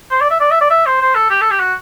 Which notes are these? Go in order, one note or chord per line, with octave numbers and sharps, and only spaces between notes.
C5
D5
E5
D5
E5
D5
E5
C5
C5
A4
G4
A4
G4
F#4